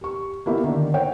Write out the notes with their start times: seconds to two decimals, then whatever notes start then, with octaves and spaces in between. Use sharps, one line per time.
0.01 G4 C#6
0.46 A#3 B3 E4 G4
0.64 D3 D#3
0.94 C5 C#5 E5 F#5 G5